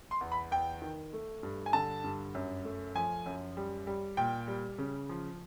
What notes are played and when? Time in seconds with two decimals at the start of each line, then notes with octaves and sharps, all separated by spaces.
0.11 C6
0.21 E2
0.32 B5
0.51 E2 G5
0.82 D#3
1.13 A3
1.43 G2
1.66 G#5
1.73 D3 A5
2.04 G2
2.35 F#2
2.65 A3
2.95 F3 G#5
3.26 F#2
3.57 G3
3.87 G3
4.17 A#2 G5
4.48 G3
4.78 C#3
5.09 F3